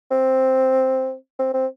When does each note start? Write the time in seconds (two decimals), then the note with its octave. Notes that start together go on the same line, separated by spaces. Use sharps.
0.11 C4
1.39 C4
1.54 C4